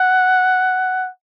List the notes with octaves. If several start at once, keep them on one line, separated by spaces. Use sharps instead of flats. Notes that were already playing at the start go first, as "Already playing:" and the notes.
Already playing: F#5